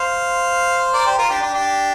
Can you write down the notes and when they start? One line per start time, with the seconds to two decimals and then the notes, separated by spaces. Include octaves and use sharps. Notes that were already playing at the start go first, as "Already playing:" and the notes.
Already playing: C5 F5
0.94 A#4 D5
1.06 G4 C5
1.18 F4 A#4
1.30 D4 G4
1.42 D4 G4
1.54 D4 G4